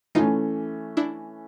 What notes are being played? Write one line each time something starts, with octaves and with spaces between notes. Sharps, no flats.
E3 A3 C#4 D#4 F4
D4 E4